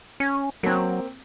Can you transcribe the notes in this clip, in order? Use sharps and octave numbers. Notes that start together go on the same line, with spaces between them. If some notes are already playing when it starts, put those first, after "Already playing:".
C#4
F#3 A#3 C4